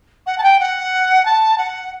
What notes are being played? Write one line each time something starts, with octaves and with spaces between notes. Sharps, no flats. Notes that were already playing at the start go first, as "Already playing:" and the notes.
F#5
A5
G5
F#5
A5
F#5